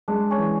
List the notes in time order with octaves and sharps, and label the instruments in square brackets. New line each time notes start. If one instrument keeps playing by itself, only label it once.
[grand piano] G#3 [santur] D4
[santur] C#4
[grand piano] E3